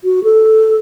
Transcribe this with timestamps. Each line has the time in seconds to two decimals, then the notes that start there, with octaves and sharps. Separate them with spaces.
0.04 F#4
0.24 A4